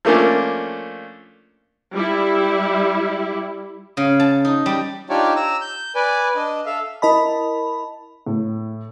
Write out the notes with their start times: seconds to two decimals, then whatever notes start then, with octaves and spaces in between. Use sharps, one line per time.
0.05 F3 A3 A#3 C#4 D4
1.93 G3 E4
3.97 C#3
4.20 A5
4.45 D#4
4.66 G3
5.10 D4 D#4 F4 G4 C#5 D5
5.36 A#5 E6
5.61 G6
5.95 B4 D5 G#5
6.36 D4 D#5
6.66 A4 E5 F5
7.02 E4 A#4 D#5 A5 B5
8.26 A2